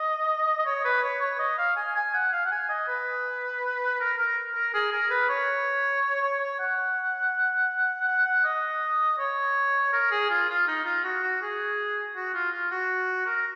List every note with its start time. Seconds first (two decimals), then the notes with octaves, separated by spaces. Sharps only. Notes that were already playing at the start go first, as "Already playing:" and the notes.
Already playing: D#5
0.58 D#5
0.66 C#5
0.85 B4
1.03 C#5
1.21 C#5
1.39 D#5
1.58 F5
1.76 G#5
1.96 G#5
2.14 F#5
2.32 F5
2.46 F#5
2.52 G#5
2.69 D#5
2.88 B4
4.00 A#4
4.18 A#4
4.55 A#4
4.74 G#4
4.92 A#4
5.10 B4
5.29 C#5
6.22 C#5
6.40 C#5
6.59 F#5
8.08 F#5
8.25 F#5
8.44 D#5
9.19 C#5
9.93 A#4
10.11 G#4
10.30 F4
10.49 F4
10.68 D#4
10.85 F4
11.04 F#4
11.23 F#4
11.42 G#4
12.16 F#4
12.34 F4
12.52 F4
12.71 F#4
13.26 A#4